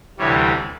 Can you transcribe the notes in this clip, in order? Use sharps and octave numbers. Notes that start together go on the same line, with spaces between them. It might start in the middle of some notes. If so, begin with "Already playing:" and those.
D2 C3 E3 G3 C#5